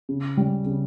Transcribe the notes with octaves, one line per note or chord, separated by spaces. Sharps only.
C#3
G3 C#4
C#3